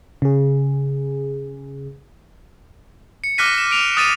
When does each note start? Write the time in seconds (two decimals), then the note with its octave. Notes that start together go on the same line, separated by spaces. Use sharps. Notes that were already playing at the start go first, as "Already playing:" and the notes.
0.22 C#3 G#4
3.24 C#7
3.38 D6 F6 F#6 A#6 B6 D#7
3.58 E7
3.71 D7 F7
3.97 D#6 F#6 A6 D#7 E7